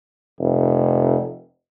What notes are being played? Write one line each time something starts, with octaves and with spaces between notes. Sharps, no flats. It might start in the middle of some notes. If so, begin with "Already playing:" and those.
F1